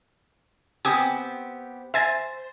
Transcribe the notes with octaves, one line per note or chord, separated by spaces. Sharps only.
B3 C4 G4 G#5 D6 D#6
C5 E5 G#5 A6